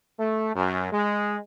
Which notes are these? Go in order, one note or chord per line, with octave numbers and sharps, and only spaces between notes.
A3
F#2
G#3